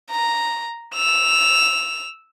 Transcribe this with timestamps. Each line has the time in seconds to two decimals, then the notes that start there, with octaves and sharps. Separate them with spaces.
0.11 A#5
0.94 E6 F7